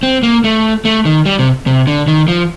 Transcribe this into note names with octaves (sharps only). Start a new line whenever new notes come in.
C4
A#3
A3
A3
D#3
G3
C3
C3
D3
D#3
F3